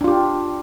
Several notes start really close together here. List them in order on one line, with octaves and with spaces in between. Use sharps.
D4 F4 G4